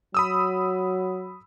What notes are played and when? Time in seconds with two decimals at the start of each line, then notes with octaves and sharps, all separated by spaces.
0.14 F#3 B5 D#6 E6